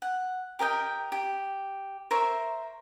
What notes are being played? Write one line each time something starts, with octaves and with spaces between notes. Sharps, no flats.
F#5
G4 A#4 D#5 G5
G4
A#4 C5 E5 C#6